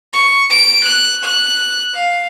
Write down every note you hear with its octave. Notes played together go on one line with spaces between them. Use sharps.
C#6
D7
F#6
F#6
F5